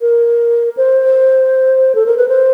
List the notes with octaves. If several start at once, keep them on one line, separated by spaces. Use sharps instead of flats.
A#4
C5
A4
A#4
B4
C5